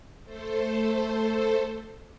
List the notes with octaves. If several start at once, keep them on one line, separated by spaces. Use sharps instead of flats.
A3 A4 C5